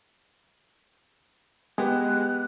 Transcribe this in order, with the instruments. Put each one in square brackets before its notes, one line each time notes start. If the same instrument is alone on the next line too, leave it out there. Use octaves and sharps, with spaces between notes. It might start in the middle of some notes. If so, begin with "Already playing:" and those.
[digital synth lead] G#3 [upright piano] B3 G4 [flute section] F#6